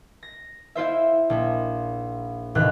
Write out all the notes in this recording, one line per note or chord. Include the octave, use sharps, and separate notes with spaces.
A#6
E4 F4 C5 E5
A#1
E1 D#2 A2 C3 F#6